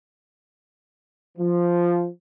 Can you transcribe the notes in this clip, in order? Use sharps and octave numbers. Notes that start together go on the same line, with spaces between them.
F3